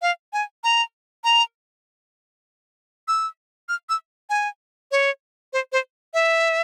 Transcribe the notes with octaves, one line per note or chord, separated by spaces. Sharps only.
F5
G#5
A#5
A#5
E6
F6
E6
G#5
C#5
C5
C5
E5